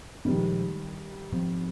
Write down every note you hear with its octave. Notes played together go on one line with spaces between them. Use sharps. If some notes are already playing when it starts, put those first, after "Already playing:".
A#2 D#3 F3 G3 G#3
G#2 F3 C4